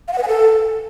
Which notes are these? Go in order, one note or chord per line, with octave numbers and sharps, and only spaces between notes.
F5
F#5
B4
G#5
A4